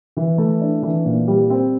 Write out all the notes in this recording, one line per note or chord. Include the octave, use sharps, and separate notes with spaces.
E3
A3
D4
E3
A#2
G3
C4